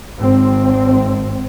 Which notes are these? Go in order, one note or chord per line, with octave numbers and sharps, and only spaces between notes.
G#1 C4